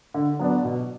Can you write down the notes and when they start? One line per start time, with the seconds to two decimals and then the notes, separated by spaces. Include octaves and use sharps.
0.14 D3
0.39 F#3 B3 D4
0.65 B2